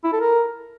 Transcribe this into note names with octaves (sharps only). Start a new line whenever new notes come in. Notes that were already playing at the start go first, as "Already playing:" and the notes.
E4
A4
A#4